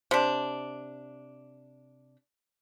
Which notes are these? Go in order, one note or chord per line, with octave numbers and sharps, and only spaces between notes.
C3 D4